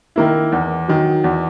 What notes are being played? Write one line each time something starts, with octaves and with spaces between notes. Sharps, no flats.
D#3 A#3 E4
E2
D#3 F#3
E2